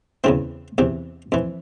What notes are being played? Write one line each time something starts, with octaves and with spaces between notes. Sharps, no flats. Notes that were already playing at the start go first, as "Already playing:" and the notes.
E2 C#3 E3 C4
E2 C3 E3
F2 E3